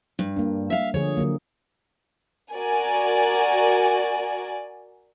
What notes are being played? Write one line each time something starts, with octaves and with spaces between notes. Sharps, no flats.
G2
A#3 D4
E5 F5
D3 F3 G#4 C#5
D3 F#3 A#3
F#4 A#4 D5 G#5